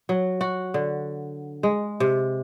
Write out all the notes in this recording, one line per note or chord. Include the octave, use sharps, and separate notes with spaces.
F#3
F#4
D3
G#3
C3